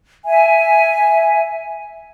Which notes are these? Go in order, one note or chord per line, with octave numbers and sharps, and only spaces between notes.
E5 G#5